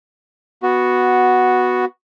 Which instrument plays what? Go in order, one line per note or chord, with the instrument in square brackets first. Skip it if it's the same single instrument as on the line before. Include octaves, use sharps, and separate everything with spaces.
[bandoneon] B3 F#4